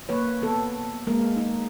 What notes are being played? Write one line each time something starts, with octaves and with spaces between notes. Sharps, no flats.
A#3 B4 C#5
B3 A4
G#3 A#3 A#4
D#4